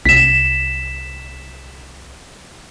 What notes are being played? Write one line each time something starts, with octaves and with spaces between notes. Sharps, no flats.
C2 B6 E7